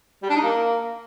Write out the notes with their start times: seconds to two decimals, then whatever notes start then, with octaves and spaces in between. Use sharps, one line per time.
0.23 G3
0.29 D4
0.36 D#4
0.43 A#3